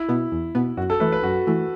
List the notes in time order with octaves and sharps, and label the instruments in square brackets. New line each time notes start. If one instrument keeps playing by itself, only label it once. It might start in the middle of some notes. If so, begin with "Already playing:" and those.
Already playing: [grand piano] E4
[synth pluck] B2 B3
E2
B2 B3
[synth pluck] F#2 [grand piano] F#4
[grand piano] A4
[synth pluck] E3 A3 [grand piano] B4
[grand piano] B4
[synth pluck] F#2 [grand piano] F#4
[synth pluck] E3 A3